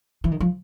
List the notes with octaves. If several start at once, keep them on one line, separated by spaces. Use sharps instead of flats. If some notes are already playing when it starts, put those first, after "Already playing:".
E3
D#3
F3